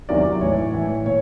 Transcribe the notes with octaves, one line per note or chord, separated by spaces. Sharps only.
E2 C3 D#3 F#3 D5
A2 E3 C#5
A2 E3
A#2 C#5